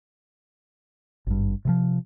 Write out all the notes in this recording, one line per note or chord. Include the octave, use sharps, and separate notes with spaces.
G#1 G2
C3 E3 F3